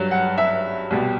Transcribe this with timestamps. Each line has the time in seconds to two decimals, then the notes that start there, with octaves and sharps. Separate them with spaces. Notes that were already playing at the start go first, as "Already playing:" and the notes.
Already playing: G2 F#3
0.11 F#5
0.38 E5
0.91 C2 B2 G3